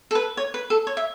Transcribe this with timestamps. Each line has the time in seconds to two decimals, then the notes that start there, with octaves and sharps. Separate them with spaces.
0.11 A4
0.15 B4
0.37 C#5
0.54 B4
0.70 A4
0.87 C#5
0.97 E5